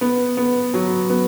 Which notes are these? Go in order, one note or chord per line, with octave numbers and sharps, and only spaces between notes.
B3
B3
F#3
B3